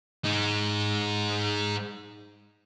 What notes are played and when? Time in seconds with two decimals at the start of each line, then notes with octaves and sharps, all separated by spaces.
0.25 G#3 D#4